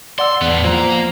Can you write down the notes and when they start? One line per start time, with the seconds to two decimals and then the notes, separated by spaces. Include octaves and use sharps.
0.19 D5 F#5 C6 E6
0.42 E2 A2 B3
0.64 F3 A#3 A#5